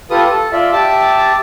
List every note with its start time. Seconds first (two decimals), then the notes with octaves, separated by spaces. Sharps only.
0.11 F4 G4 A4 B4 D#6
0.29 A4
0.52 F4 D5 E5
0.72 G4 E5 A5 D6